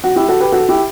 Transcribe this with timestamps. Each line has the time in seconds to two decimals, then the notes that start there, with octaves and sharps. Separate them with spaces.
0.04 F#4
0.16 E4 G4
0.28 F#4 A4
0.40 G4 B4
0.52 F#4 A4
0.69 E4 G4